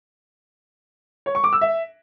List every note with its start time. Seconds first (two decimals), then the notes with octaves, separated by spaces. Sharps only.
1.26 C#5
1.35 C#6
1.44 D6
1.53 E6
1.61 E5